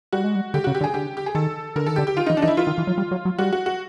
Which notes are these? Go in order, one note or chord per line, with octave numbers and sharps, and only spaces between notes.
G3 F#4
G#3
G3
D3 G4
C#3 F#4
G4
D3
G#4
D3 G4
G4
G#4
D#3 A4
D3 A#4
D#3 A4
D3 G4
G4
D#3 F4
E3 D#4
D4
E3 D#4
E4
E3 F4
D#3
E3
F#3
G3
F#3
F#3
G3 F#4
F#4
F#4